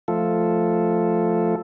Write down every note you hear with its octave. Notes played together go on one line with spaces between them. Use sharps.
F3 A3 F4 A4